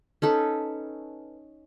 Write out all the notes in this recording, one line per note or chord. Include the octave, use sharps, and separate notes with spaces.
C#4 D#4 A4 B4